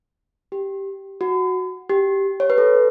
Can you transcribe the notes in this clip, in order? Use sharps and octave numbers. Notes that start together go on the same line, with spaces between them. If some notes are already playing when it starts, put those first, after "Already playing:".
G4
F#4
G4
C#5
B4
A4